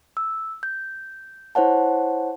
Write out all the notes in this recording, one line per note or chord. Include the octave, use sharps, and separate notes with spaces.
E6
G6
E4 C5 C#5 F#5 A5